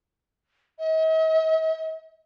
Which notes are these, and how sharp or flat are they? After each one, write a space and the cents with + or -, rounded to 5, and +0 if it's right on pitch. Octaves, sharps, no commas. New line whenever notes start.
D#5 +45